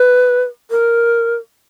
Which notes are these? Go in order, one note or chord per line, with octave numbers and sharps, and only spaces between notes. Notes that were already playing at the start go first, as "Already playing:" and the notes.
Already playing: B4
A#4